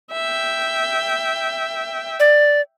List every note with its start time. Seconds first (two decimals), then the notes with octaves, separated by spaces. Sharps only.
0.12 E5 G5
2.20 D5